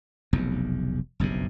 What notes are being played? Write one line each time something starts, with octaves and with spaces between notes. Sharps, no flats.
F1 B1 E2
F#1 B1 G2 C3